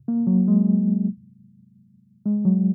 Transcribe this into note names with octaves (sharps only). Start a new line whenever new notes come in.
A#3
F#3
G#3
G#3
F#3